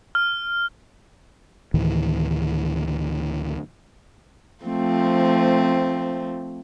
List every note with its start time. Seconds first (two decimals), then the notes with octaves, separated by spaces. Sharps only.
0.15 F6
1.74 D2 A2 D#3 E3
4.64 F3 A3 C4